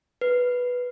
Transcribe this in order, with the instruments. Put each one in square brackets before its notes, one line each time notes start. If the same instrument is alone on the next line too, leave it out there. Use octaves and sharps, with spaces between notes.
[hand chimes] B4